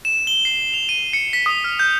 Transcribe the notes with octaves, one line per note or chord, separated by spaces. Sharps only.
E7
G7
C7
F7
D#7
C#7
B6
D#6
F6
G6